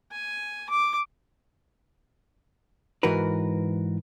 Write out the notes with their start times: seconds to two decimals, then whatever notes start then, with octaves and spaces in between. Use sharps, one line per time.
0.11 G#5
0.70 D6
3.03 G#2 E3 F#4 A#4 B4